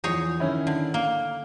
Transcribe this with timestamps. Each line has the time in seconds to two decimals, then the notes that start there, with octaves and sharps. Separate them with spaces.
0.04 E2 F3 D#4 G#4 C#5
0.40 D#3 C#4 E4
0.67 D3
0.94 A#3 G7